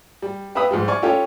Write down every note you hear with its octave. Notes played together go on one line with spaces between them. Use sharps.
G3
G4 B4 E5 F5 B5 D#6
G#2 F3 G3
D5 G#5 C#6 F6
C#4 F4 G4 A4 C#5